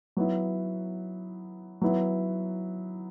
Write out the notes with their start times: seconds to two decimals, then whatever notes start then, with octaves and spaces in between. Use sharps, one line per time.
0.17 F#3 B3 E4
1.82 F#3 B3 E4